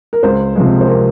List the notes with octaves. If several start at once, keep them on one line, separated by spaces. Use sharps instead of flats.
A#4
C#2 C5
C3 F3 G#3
C5
A#4